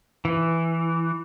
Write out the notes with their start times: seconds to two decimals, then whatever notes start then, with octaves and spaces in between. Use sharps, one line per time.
0.25 E3